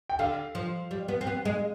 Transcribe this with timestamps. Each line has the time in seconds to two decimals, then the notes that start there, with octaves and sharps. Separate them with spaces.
0.09 G5
0.19 D3 F5
0.55 F3
0.91 G3
1.08 B3
1.21 C4
1.27 B3
1.45 G#3